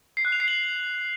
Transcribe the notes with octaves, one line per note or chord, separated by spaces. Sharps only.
C7
F#6
F7
C7
F#7